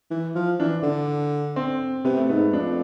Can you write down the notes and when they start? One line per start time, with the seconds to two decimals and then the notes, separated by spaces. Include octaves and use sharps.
0.11 E3
0.35 F3
0.60 E3 D4
0.83 D3
1.56 C4
2.04 C3 B3
2.17 A3
2.29 G#2 B3
2.53 F2 D4